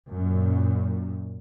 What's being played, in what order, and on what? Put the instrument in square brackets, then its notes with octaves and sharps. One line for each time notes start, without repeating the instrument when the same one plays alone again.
[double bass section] F#2 A#2